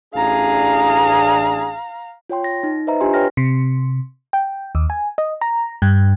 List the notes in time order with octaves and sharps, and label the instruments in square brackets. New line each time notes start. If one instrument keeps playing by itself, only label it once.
[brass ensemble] A1 D4 G#4 [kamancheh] F5 A#5
[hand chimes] F4 C#5 G5 C6
A#6
D#4
B4 C5 D#5 E5 A#5
D4 F4 G4 G#5 C6
B4 C#5 G5 F6 A#6
[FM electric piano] C3
G5
D#2
G#5
D#5
A#5
G2